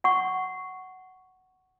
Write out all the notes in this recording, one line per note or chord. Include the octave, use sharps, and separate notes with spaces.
F#5 C#6